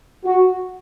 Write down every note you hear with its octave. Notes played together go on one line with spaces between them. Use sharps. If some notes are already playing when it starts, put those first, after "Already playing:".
F#4